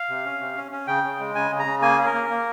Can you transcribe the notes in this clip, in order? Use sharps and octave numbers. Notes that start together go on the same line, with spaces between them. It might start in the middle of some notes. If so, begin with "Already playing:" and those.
Already playing: F5
C3
C#4
C3
C#4
C#4
C#3 G5
C#3
G#3
C#3 G#5
C#3
A#5
C#3
A#3 G#5
C#4 G#4
A#4
A#3
A#3